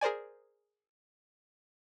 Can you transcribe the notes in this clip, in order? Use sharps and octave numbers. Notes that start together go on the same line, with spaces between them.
G#4 A#4 C5 D5 G#5